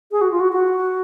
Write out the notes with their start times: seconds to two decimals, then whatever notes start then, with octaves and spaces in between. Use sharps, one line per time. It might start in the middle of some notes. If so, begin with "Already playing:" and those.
0.11 G#4
0.21 F#4
0.31 F4
0.40 F#4
0.52 F#4